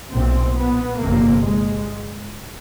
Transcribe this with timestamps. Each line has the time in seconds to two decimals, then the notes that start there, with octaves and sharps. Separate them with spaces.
0.14 B1 A#2 C4
0.57 B3
1.00 G1 F2 C3 A#3
1.44 G#3